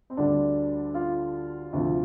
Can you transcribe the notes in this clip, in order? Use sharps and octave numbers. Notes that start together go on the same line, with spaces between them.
C4
D2 D3 G3 D4
F4
D2 C3 F3